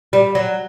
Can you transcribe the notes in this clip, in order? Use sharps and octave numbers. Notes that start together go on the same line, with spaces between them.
G3
F#3